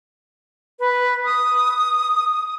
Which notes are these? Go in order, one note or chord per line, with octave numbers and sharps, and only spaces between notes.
B4
D#6